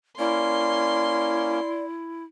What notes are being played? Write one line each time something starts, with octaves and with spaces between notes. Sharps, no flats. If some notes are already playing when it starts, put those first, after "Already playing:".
A#3 C#4 E4 D5 C6